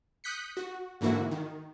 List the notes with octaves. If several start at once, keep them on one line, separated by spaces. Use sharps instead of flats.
D#6 F#6 G6 B6 C#7
F#4
G#2 D3 E3 A#3 E4 F#4
D#3